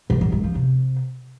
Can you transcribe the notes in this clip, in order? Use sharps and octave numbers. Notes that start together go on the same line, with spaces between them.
G#2
F#2
G#3
F3
C3